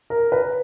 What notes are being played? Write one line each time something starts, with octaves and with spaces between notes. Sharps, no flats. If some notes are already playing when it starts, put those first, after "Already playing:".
A#4
B4